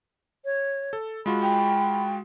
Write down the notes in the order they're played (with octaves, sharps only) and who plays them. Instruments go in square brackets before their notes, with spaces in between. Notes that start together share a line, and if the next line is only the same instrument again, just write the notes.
[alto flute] C#5
[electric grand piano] A4
[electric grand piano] G#3 F4 F#4 [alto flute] B5
[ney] G5